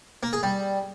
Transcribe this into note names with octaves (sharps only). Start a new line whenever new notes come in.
A#3
G#4
G3